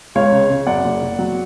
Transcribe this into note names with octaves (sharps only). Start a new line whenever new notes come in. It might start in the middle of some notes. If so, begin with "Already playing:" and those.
C#2 C#5 F5
C#3
C#3
F#2 D5 F#5
F#1
F#1
F#3